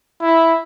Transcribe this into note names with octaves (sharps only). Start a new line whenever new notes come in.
E4